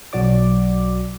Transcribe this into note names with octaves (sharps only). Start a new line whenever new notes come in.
B1 F#3 F#4 D5 D6